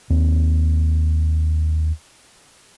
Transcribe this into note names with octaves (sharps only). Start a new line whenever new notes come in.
D#2 C4